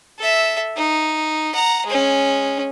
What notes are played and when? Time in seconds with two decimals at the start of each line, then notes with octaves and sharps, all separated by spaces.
0.18 A4 E5
0.76 D#4
1.53 F#5 A#5
1.86 G#3 C#4